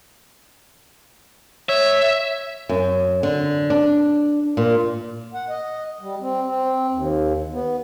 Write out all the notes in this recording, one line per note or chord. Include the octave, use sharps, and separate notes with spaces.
C#5 E5
F#2
D3
D4
A#2
F#5
D#5
G3
C4
C4
D#2
B3